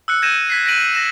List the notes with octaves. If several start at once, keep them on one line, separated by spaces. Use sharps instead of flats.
E6 F#6 C#7
G6 G#6 A#6 D#7 E7
G#6 B6 C7
A#6 B6 D7 D#7 F#7
A#6 E7